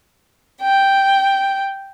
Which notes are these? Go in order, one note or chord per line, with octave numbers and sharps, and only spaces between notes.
G5